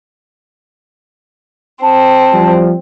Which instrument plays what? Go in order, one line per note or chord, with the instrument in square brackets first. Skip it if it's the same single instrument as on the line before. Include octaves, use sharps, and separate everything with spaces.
[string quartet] C4 [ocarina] A5
[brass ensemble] F3 G3